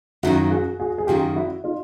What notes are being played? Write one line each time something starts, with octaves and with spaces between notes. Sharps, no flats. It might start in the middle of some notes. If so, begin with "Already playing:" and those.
F#2 D#3 F#3 A#3 E4 F#4
F#4 G#4
F#4 G#4
G#4
F#2 D#3 F#3 A#3 F4 G4
E4 F#4
D#4 F4